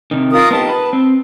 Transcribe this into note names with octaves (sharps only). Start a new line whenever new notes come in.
C3 D#3
F4 A#4 D#6
B3 D#4 G4 A5
B4
C4